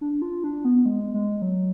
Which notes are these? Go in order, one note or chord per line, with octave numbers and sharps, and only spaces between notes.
D4
F4
D4
B3
G#3
G#3
F#3